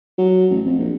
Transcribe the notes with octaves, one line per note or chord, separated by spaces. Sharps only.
F#3
A1
F2
A#1